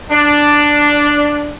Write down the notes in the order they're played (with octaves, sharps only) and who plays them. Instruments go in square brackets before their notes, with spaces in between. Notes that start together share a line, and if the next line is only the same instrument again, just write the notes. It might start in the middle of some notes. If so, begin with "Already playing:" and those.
[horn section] D4